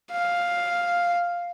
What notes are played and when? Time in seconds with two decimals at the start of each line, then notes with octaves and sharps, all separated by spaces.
0.12 F5